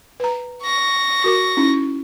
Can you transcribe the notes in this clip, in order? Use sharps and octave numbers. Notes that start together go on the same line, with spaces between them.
B4 A#5
C#6 A#6
F#4 A#4 D6
C#4 D#4 E4